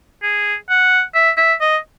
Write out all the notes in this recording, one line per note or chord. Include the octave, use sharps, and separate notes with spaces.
G#4
F#5
E5
E5
D#5